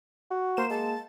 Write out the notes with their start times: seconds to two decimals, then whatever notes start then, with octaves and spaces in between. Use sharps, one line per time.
0.31 F#4
0.57 A#3 C5 E7
0.70 G#3 A5